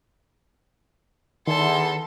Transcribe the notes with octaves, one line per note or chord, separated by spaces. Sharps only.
E2 D#3 A4 C6